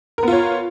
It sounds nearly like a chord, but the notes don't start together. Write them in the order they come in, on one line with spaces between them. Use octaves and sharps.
A#4 B3 F4 C#5